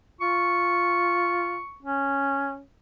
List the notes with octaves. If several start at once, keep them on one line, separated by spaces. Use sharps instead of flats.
F4 C#6
C#4